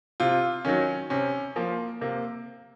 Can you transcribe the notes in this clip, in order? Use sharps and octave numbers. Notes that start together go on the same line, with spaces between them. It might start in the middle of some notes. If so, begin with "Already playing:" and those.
C3 F4
D#3 F#3 C#4
C3 C#4
F3 A#3
C3 A#3